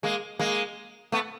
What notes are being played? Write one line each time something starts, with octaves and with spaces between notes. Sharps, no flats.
G#3 A#3
G#3 A#3
A3 B3